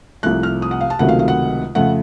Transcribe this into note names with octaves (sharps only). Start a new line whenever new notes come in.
C2 C3 F3 A3 F#6
F6
D#6
F#5
F5
A5
C#2 C3 D#3 F#3 A3 F#5
F5
F5
F#5
F2 C#3 A3 F#5